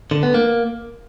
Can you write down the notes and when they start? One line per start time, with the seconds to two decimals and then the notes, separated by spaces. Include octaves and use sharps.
0.11 D3
0.23 B3
0.34 A#3